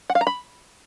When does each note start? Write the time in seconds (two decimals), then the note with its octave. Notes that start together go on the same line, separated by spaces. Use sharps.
0.10 F#5
0.15 F5
0.21 A#5
0.27 B5